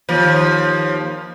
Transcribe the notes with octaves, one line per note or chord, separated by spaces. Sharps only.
D#2 F3